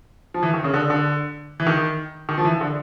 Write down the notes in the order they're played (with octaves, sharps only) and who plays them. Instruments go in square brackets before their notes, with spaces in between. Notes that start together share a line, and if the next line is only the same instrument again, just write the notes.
[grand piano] F3
E3
D#3
C#3
D3
D3
E3
D#3
D#3
F3
E3
D3